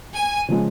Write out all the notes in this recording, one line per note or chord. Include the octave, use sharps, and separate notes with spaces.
G#5
C#3 F3 G#3